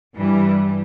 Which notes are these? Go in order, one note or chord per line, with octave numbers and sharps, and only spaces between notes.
G2 E3 G3